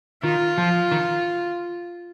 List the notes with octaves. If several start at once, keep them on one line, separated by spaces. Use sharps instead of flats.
D#3 F4
F3
D#3